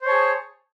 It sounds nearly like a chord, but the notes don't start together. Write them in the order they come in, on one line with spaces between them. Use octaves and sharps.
C5 C#5 A5 G#4